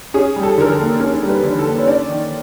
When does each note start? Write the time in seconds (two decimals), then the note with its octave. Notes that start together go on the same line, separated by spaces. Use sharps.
0.14 C#4 G#4
0.36 G3
0.43 A4
0.58 D3 A#4
0.71 A4
0.79 A#3
1.00 C#4 A#4
1.23 G3
1.29 B4
1.43 D3
1.59 A4
1.65 A#3
1.78 C#5
1.87 C#4 D5
2.09 D#3